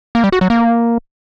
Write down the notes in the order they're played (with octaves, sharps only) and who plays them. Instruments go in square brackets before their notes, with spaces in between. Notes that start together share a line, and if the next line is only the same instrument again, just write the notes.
[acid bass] A#3
G3
F#4
F#3
A#3